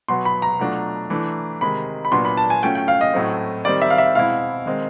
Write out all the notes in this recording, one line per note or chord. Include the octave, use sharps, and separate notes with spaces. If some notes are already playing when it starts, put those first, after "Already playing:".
B2 F#3 B3 C6
B5
A#5
B2 F#3 A3 D4 F4
E3 A3 D4
C3 D#3 G#3 B5
B5
A#2 F#3 B3 D4 C6
B5
A5
G#5
F#3 A3 C#4 F4 G5
G5
F5
D#5
A2 F#3 A3 C4
D#3 G3 C4 D#4 D5
E5
F5
E5
B2 G#3 C4 E4 F5
D#3 G#3 C4